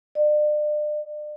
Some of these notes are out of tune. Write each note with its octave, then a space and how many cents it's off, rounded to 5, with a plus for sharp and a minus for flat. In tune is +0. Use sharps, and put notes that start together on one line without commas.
D5 +35